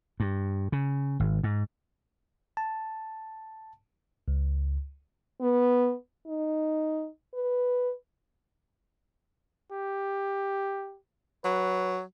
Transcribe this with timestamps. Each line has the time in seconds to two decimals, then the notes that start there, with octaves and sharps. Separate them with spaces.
0.20 G2
0.72 C#3
1.20 G#1
1.43 G#2
2.57 A5
4.28 C#2
5.41 B3
6.27 D#4
7.34 B4
9.72 G4
11.44 F#3 B4